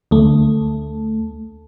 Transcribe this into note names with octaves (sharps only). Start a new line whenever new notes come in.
D2 A3